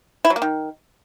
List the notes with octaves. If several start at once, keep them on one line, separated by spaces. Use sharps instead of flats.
E4
F#3
A#3
D#3